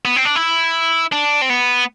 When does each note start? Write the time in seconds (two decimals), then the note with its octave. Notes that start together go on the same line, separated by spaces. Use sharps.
0.05 B3
0.16 C4
0.25 D4
0.36 E4
1.12 D4
1.42 C4
1.50 B3